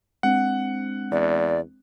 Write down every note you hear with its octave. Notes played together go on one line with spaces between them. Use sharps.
G#3 C4 D4 F#5
E2 D5